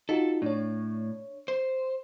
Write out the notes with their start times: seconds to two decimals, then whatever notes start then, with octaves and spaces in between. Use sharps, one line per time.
0.09 D#4 F4 F#4 A4
0.42 A2 D4 C#5
1.48 C5